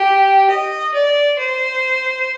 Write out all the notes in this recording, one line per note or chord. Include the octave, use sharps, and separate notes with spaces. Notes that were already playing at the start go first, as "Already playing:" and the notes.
Already playing: G4
D#5
D5
C5